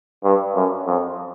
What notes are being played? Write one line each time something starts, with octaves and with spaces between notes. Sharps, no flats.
G2
F#2
F2